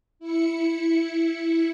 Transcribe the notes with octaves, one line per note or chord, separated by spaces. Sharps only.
E4 C#7